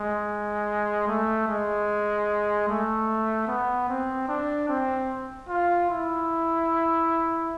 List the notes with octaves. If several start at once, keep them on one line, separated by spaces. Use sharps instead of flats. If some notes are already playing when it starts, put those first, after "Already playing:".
Already playing: G#3
A3
G#3
A3
B3
C4
D4
C4
F4
E4